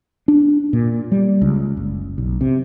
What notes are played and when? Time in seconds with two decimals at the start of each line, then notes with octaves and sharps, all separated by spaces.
0.28 D4
0.73 A#2
1.11 G3
1.42 C#2
1.77 F#1
2.18 B1
2.41 C3